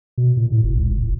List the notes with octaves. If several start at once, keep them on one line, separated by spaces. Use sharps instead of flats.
B2
A#2
A2
F#1
C#2
F#1
E1